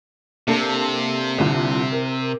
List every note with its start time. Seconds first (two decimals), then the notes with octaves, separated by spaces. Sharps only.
0.48 C3 A#3 D4 A4
1.38 C2 A#2 D3
1.92 A#4